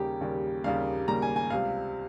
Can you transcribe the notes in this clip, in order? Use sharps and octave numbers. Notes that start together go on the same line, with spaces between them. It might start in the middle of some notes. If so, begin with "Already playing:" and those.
Already playing: D#2 C#3 G3 A#3 G4
D#2 C#3 G3 A#3
D#2 C#3 G3 A#3 F5
D#2 C#3 G3 A#3 A#5
G#5
G#5
C#2 C3 G3 F5